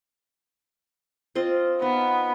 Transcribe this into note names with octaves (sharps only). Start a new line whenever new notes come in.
C4 F4 D#5
B3 D#4